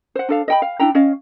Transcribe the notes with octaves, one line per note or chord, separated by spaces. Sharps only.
C5 F#5
D4 A4 F5
D#5 G5 B5
F5
D4 E4 G5 A#5
C#4 C#5 D#5 F5